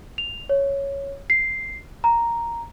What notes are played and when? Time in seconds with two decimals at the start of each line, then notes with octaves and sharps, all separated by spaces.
0.18 F7
0.49 C#5
1.30 C7
2.04 A#5